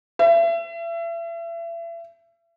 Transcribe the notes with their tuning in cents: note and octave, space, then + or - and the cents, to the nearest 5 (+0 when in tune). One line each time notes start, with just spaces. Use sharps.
E5 +35